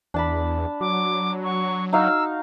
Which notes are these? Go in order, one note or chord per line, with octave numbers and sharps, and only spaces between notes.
E2 D4 A5 B5
F#3 D6
C#6
D#4 F#4 F5 E6